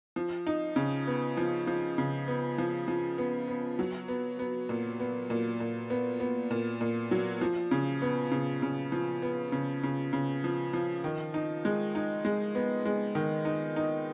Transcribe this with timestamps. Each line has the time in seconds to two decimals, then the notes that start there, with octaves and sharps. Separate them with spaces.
0.16 F3
0.47 D#4
0.76 C#3
1.07 B3
1.37 F3
1.67 F3
1.98 C#3
2.28 B3
2.58 F3
2.88 F3
3.18 B3
3.48 B3
3.79 F#3
4.08 B3
4.39 B3
4.69 A#2
5.00 B3
5.30 A#2
5.60 A#2
5.90 B3
6.20 B3
6.51 A#2
6.81 A#2
7.11 F#3
7.41 F3
7.71 C#3
8.02 B3
8.31 C#3
8.62 C#3
8.92 F3
9.22 B3
9.52 C#3
9.83 C#3
10.13 C#3
10.44 F3
10.73 F3
11.04 D#3
11.34 D#4
11.65 G#3
11.95 D#4
12.25 G#3
12.55 B3
12.85 G#3
13.15 D#3
13.45 D#4
13.76 D#4